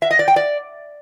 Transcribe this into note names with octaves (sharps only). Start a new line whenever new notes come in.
E5
D#5
D5
G5
D5